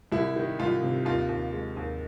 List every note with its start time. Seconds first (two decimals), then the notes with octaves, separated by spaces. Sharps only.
0.12 C2 E4
0.36 D#3
0.59 C2 F4
0.83 C3
1.05 D#2 F4
1.29 D#2
1.52 G#3
1.76 D#2